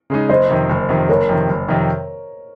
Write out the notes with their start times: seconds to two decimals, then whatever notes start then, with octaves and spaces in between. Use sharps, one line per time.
0.10 C#3 G#3 D#4
0.29 F#1 C5 D#5
0.49 F2 C3 D#3
0.69 F#1
0.89 F2 C3 D#3
1.08 F#1 A#4 C#5
1.29 F2 C3 D#3
1.49 F#1
1.68 F2 C3 D#3